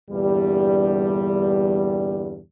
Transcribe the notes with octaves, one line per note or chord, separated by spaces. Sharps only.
E2 G2 A#2 D3 G3